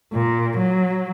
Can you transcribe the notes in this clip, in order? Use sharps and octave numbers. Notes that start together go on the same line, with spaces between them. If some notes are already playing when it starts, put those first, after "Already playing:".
A#2
F#3